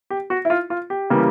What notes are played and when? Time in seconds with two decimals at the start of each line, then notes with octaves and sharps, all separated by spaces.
0.10 G4
0.30 F#4
0.45 E4
0.50 F4
0.70 F4
0.90 G4
1.10 C#3 E3 G3 A#3